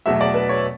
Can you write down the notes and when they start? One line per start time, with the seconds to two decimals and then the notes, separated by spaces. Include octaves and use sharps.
0.06 E2 B2 F#3 A3 E5
0.21 D5
0.34 B4
0.49 C#5